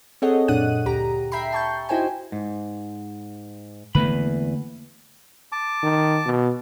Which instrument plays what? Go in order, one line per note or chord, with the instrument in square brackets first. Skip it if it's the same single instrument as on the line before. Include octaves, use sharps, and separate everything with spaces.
[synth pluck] C4 G#4 A4 C#5 D#5 F#5
F#2 A#2 D4 F#5 F#6 D#7
D2 G4 A#5
E5 G5 A#5 B5 C7
A5 C#6 G6
D#4 E4 F#4 C5 G5 G#5
[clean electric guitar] G#2
[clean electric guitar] E2 B4 B5 [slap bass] D3 A3 A#3
[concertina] A5 D6
[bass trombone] D#3
B2